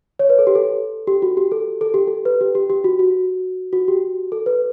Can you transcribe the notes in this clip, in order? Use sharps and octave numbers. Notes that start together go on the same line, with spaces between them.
C#5
B4
A4
G4
A4
G4
F#4
G4
A4
A4
G4
A4
B4
G4
G4
G4
F#4
F#4
F#4
G4
A4
B4